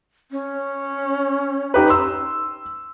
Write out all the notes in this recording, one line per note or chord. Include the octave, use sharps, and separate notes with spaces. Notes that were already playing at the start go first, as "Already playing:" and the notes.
C#4
D#4 G4 B4
C6 E6